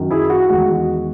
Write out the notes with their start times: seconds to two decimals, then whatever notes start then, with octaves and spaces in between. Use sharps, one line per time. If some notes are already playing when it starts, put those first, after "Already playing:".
Already playing: F#2 D#3 F#3
0.11 E4 G#4
0.30 F#4
0.49 E2 D#3 G#3 F#4
0.75 F#4